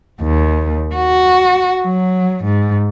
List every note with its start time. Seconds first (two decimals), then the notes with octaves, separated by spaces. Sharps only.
0.22 D#2
0.95 F#4
1.83 F#3
2.45 G#2